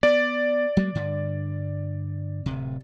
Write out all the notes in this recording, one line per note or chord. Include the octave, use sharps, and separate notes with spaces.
B3 D5
F#3 G#3 A#3
G2 D3
D1 C3